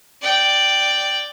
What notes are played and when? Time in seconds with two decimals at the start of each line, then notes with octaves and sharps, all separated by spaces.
0.22 D5 G5